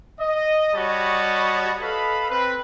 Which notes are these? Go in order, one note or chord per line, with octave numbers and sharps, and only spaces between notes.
D#5
G3 F#4 C#5 D#5 A5 B5
A4 B4 D#5 F5 B5
C4 B4